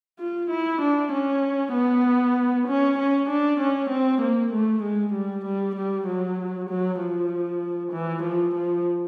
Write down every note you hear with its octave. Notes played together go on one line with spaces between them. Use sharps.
F4
E4
D4
C#4
B3
C#4
C#4
D4
C#4
C4
A#3
A3
G#3
G3
G3
G3
F#3
F#3
F3
E3
F3
F3